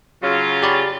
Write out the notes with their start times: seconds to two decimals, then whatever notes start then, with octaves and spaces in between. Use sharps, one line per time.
0.23 C#3 F#3 F4
0.63 G4 D5 B5